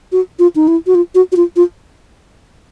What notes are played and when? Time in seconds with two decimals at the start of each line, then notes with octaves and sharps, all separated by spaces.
0.12 F#4
0.39 F4
0.56 D#4
0.68 E4
0.87 F#4
0.95 F4
1.15 F#4
1.32 F#4
1.36 F4
1.56 F4